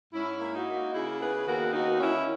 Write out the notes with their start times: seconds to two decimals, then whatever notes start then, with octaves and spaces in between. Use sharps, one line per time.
0.13 G#2 C#4 E4
0.40 A#3
0.53 D#4 F#4
0.67 A#3
0.93 C#3 E4 G#4
1.20 B3 G#4 B4
1.46 D#2 F#4 A#4
1.73 B3 D#4 F#4
2.00 D#3 C#4 E4